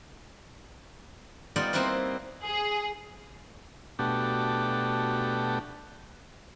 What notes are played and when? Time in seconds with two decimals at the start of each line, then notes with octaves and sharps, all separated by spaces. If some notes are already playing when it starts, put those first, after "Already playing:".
1.56 G3 B3 D#4 F4 D5
1.73 A#3 C4 D#4 E4 B4 C5
2.43 G#4
3.99 B2 A3 D4 F#4 G4